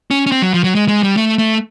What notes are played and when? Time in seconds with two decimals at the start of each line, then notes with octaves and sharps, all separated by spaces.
0.11 C#4
0.26 C#4
0.32 C4
0.42 F#3
0.54 F3
0.64 F#3
0.75 G#3
0.88 G#3
1.03 G3
1.17 A3
1.38 A3